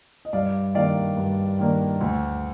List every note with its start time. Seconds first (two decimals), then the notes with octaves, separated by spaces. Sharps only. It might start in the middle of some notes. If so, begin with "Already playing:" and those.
0.25 D#5
0.33 G2 D5 F5
0.74 D#3 A#3 D4 D5 F5
1.17 G2
1.59 D#3 A#3 D4
2.01 D2